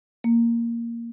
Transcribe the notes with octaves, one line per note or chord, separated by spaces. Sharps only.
A#3